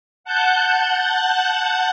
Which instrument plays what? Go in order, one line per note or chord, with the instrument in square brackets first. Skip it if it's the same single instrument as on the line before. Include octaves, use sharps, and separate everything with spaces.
[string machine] F#5 A5 F#6 G6